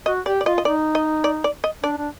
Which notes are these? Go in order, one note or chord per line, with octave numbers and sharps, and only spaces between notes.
F#4 D#5
G4 D5
D5
F4 D#5
D#5
D#4 D5
D#5
D5
D5
D#5
D4 D5
D4